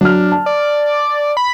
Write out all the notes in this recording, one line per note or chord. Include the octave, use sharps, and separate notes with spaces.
F#3 D4 F6
A5
D5
B5